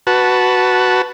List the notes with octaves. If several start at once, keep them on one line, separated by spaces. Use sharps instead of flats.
F#4 B4 A5